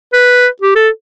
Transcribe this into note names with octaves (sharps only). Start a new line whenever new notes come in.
B4
G4
A4